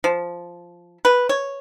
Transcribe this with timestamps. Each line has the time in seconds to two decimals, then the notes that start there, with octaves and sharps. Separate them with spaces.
0.04 F3
1.05 B4
1.29 C#5